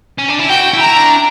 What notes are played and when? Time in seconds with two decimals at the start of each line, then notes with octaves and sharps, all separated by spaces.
0.19 C#4
0.29 D4
0.39 E4
0.49 F#4 G5
0.74 E4
0.80 A#5
0.97 D4